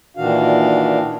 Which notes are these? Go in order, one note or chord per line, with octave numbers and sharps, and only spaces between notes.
A#2 D#3 E3 D4 F#4 F5